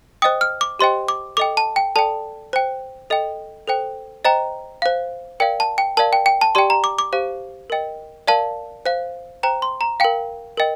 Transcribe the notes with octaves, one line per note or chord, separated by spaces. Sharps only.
C5 D#5 G5 D#6
F6
D6
G4 C5 D#5 G5 C6
D6
A4 D#5 G5 D6
A5
G5
A4 D5 G5 A5
C5 G5
A4 D#5 G5
A4 C5 G5
C5 D#5 G5 A#5
C5 F5
A#4 D5 F5 G5
A5
G5
A#4 D5 F5 A5
G5
G5
A5
G4 D5 G5 C6
A#5
D6
D6
G4 C5 F5
A#4 D#5 G5
A#4 D5 F5 A5
C5 F5
C5 G5 A#5
C6
A#5
A#4 F5 G5
A#4 D#5 G5